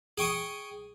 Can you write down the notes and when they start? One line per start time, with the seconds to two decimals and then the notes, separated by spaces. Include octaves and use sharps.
0.18 G#4 G5 C#6 D#6